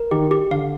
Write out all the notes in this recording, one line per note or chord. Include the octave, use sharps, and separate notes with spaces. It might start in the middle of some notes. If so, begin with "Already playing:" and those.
Already playing: A#4
D#3 G4
G4
D3 F5